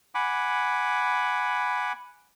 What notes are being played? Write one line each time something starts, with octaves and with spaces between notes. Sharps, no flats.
F#5 G#5 B5 D6